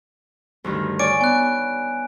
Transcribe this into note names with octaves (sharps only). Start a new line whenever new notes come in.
D2 G2 D#3
C#5 D5 G#5 D7
B3 G#5 F#6